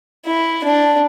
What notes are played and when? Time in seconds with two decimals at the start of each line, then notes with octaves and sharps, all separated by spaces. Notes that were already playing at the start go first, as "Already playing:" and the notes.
0.26 E4
0.64 D4